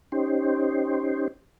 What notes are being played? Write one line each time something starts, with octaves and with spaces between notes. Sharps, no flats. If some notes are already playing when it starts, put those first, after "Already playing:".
C#4 D#4 G4 C5